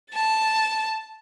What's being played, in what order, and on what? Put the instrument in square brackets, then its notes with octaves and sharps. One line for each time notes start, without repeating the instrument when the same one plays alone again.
[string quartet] A5 A6